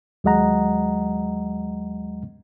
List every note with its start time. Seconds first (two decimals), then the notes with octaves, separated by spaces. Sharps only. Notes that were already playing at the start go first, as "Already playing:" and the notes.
0.24 D#2 F#3 G#3 D#5 F#5 A#5